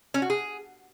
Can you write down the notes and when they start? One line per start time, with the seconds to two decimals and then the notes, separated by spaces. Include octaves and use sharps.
0.14 C#4
0.22 F#4
0.30 G#4